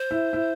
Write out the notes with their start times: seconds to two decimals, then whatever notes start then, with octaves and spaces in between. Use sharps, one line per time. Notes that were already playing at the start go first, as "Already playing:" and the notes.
Already playing: C5
0.11 E4
0.33 E4